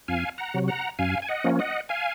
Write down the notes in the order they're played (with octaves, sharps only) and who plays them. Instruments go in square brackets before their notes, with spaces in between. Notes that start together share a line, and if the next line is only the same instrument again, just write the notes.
[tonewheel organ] F2 F5 G#5
F#5 A#5
C3 F#3
F#5 A#5
F#2 F5 G#5
G#5
D#5 F#5
F3 A#3 C#4
D#5 F#5
F5 G#5